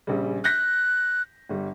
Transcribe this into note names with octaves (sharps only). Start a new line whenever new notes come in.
A#1 C#3 G3
F#6 G6 A#6 B6
G1 G3